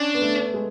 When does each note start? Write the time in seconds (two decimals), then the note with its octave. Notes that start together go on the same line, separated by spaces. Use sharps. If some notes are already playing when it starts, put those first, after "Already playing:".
Already playing: C#4 D4
0.15 B3
0.22 A3
0.54 G#3